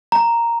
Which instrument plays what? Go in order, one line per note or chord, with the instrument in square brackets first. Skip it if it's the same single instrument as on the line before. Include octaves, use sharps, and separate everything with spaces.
[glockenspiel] A#5